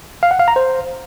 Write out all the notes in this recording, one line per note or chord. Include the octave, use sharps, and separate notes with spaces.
F5
F#5
F5
A#5
C5